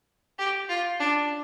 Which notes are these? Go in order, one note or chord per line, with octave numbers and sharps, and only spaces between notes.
G4
F4
D4